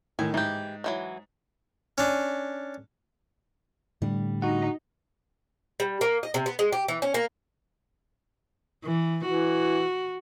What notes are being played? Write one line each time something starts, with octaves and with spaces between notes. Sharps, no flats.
A2 D#3 G#5
G#2 E3 G4
D#3 E3 F#3
C#4 D4
A2 D3 G3
D#4 F#4 F#5
G3
A#3
D#5
C3
B3
G#3
G4
E3
C#4
A#3
E3
E3 F#4